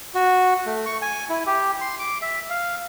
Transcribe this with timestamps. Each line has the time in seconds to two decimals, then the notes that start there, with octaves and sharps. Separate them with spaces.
0.15 F#4
0.66 A3
0.86 C#6
1.02 G#5
1.30 E4
1.46 G4
1.81 C6
1.99 D6
2.22 E5
2.50 F5